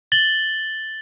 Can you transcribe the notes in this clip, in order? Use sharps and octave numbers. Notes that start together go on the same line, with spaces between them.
A6 F#7 G7